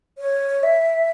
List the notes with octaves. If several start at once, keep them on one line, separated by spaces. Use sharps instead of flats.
C#5
E5